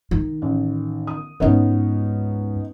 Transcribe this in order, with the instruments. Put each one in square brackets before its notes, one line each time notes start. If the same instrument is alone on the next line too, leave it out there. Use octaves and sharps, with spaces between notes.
[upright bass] D#3
[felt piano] A1
D#6
[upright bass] C#2 G#2 [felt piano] B3 C#4 D#4